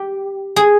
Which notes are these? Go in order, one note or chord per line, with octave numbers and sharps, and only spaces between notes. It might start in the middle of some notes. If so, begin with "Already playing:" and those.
Already playing: G4
G#4